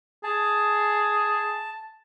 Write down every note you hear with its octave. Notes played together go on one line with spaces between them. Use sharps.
G#4 A5